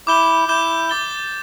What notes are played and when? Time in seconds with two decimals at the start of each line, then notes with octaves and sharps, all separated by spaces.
0.07 E4 D6 G6 E7 G7
0.49 E4 D6 G6 E7 G7
0.89 D6 A6 G7